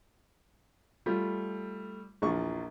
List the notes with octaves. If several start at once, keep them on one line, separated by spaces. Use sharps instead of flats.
G3 A3 F4
A#1 E2 F4 C#6